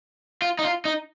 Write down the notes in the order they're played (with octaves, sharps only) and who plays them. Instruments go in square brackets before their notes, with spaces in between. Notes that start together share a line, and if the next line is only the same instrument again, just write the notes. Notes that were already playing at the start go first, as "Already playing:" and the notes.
[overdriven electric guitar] F4
D#4
F4
D#4